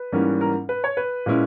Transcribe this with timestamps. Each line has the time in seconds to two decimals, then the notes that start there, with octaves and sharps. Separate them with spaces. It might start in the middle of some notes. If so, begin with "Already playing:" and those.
Already playing: B4
0.12 G#2 E3 G3 A#3 C#4
0.41 A#4
0.69 B4
0.84 C#5
0.97 B4
1.26 A#2 G#3 C#4 E4